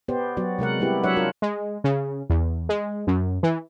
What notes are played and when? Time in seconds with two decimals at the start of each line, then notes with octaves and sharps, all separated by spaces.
0.08 B3 G4 C5 D5
0.37 F#3 B3 F#4 D5
0.59 C3 G#3 A#4 F#5
0.80 G3 B3 E4 G4
1.04 F#3 D4 C#5 E5 F#5
1.16 D4 F4 A#4
1.42 G#3
1.84 C#3
2.30 E2
2.69 G#3
3.07 F#2
3.43 E3